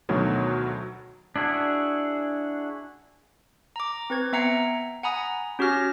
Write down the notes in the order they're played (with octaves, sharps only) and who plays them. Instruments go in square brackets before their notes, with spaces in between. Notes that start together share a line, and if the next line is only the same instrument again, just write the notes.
[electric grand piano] D2 B2 D#3 F#3 A3
[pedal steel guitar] D4 E4 F#4 G#4
[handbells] A#5 D6
C4 B4 G#6
B3 E5 G5 A#5 C7 C#7
F#5 G#5 A#5 B5 D#6
C#4 F#4 G4 F6 A#6